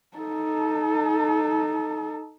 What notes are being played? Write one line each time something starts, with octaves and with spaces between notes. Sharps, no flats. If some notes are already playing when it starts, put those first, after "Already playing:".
D#4 A4